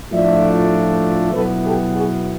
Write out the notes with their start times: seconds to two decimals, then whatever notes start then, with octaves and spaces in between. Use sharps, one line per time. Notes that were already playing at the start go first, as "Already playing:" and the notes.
0.12 A2 F3 A3 D4 F4 D5 E5
1.33 B2 F#3 B3 E4 A4 B4
1.64 G4 A4
1.94 F#4 G#4